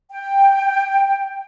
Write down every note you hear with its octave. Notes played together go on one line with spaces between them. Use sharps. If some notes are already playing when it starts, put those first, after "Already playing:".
G5